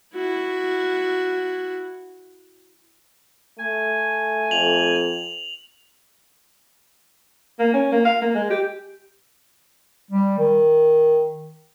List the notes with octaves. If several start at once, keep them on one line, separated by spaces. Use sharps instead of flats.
E4 F#4
A3 G#5
F2 F7 F#7
A#3
C#4
A#3
F5
A#3
G#3
G4
G3
D#3